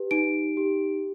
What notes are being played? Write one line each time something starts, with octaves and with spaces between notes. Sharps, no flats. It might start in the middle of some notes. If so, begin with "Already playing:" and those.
Already playing: G4 B4
D#4 D7
G4